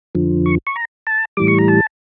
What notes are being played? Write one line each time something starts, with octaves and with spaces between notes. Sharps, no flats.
F2 D3 F3
C#6
C#6
A#5
A5
A2 E3 G3 D6
C#6
A#5
A5